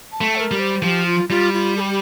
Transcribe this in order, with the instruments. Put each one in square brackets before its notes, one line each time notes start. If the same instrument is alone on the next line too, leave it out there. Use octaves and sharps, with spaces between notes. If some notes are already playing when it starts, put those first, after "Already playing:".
[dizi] A5
[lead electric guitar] A3
[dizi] C5
A#4
[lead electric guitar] G3
[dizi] C5
[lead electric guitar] F3 [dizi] G4
[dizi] F4
[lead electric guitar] G3 [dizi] F4
[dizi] F4
A4
G4